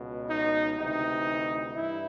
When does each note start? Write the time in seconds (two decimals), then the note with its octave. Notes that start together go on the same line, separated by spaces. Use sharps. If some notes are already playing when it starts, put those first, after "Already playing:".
Already playing: C#2 B2
0.28 D#4
0.78 D2 C3 E3 D#4
1.76 G2 E4